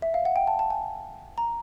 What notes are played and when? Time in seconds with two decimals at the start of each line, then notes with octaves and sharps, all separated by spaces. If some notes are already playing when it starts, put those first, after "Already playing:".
0.02 E5
0.14 F5
0.25 F#5
0.36 G5
0.47 A5
0.59 A5
0.70 G#5
1.38 A#5